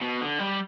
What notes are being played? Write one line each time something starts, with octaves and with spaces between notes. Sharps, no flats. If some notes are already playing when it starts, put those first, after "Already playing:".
B2
D3
G3